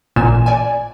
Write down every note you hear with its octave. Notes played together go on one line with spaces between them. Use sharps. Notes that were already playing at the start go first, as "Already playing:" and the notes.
A1 A#2 G#5 E7
D5 G#5